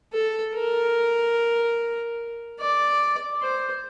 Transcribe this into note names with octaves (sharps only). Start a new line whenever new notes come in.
A4
A#4
D5
C5